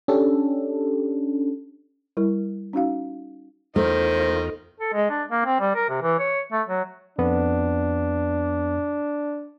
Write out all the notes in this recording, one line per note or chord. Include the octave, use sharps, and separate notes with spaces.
C#4 D4 G4 A4
G3 E4 A#4
C#4 D#4 F#4 F5
E2 D#3 A3 F4 A#4 C5 D#5
A4
G#3
D4
A#3
C4
G3
A#4
C3
E3
C#5
A3
F#3
F2 B3 D4